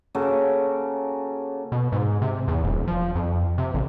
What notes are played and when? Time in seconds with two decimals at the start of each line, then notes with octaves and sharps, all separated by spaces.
0.15 C#3 A#3 F#4 A4
1.72 B2
1.92 G#2
2.22 C3
2.48 E2
2.64 D#1
2.88 F3
3.15 F2
3.58 C3
3.74 A1